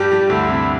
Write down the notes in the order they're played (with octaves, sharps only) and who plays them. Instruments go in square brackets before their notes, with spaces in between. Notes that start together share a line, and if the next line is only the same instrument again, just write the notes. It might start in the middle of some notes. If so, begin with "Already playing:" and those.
Already playing: [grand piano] G2 G3 [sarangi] G4
[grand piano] G2 G3
[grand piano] D2 D3 [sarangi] E4
[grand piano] C3